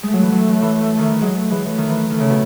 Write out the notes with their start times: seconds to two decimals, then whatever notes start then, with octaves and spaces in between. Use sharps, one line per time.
0.03 G#3 A3
0.13 F#3
0.23 E3
0.32 F#3
0.48 E3
0.62 E3
0.98 D#3
1.10 E3
1.21 F#3 G#3
1.36 A3
1.50 E3 G#3
1.66 E3 A3
1.78 D#3
1.90 E3
2.10 D#3 A3
2.20 C#3
2.30 B2